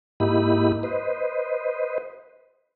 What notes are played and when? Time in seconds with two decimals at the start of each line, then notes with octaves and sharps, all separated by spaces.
0.20 G#2 A#3 E4 G4 D#5 B5
0.83 B4 C5 D#5